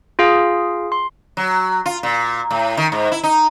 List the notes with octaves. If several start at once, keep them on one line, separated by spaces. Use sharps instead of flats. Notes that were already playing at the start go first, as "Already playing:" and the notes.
F4 G#4 F5
C6
F#3
F4
A#2
A2
D#3
G#2
E4
D#4